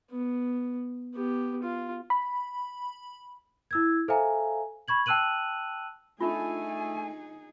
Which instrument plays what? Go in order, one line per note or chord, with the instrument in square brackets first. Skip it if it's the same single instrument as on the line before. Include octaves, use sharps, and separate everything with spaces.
[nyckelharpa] B3
B3 G4
F4
[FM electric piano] B5
[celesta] E4 E6 G#6
A4 C5 E5 F5 G#5 A#5
B5 C#6 G#6 F#7
G5 A5 E6 F#6 D#7 F#7
[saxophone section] A3 [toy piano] D4 F4 [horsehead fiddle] D#4 G#4 [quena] G#5